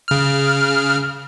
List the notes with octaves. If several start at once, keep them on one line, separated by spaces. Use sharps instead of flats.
C#3 F6